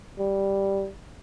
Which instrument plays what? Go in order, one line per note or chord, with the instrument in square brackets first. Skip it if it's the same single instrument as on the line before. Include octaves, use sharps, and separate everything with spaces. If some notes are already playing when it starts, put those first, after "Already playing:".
[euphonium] G3